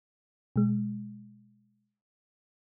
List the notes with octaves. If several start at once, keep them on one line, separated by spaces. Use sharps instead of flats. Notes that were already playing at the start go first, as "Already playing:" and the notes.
B2 G#3